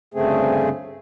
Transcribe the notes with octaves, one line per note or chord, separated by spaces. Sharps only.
D2 G2 C#3 A3 C4 G#4